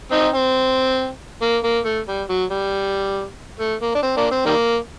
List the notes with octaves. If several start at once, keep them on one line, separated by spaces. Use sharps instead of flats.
C4 D#4
C4
A#3
A#3
A3
G3
F#3
G3
A3
A#3
D4
C4
A#3 D4
C4
D#3 G3 A#3